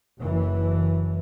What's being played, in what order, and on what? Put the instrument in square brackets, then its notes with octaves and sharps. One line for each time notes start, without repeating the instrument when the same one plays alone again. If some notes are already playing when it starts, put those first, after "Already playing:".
[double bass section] F#1 E3